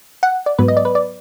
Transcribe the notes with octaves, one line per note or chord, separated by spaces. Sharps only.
F#5
D5
G#2 F#3 B3 B4
D#5
D5
B4
D5